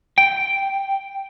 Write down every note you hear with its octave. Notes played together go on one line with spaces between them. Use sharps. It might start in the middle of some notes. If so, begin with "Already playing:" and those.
G5